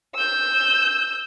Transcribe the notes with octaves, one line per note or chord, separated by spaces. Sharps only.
E6 G6